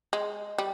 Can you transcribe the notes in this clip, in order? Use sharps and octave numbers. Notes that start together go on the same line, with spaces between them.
G#3
G3